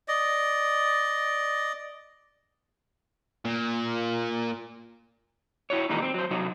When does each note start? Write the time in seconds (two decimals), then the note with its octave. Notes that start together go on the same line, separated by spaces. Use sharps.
0.08 D5 D#5
3.45 A#2
5.70 E4 F#4 C#5
5.89 A#2 D#3 E3 G3 G#3 D#4
6.02 C4
6.14 F#3 C5
6.30 C3 F#3 D#4 F#4